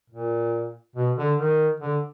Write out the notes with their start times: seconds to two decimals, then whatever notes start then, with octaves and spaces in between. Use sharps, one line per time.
0.10 A#2
0.96 B2
1.16 D3
1.38 D#3
1.80 D3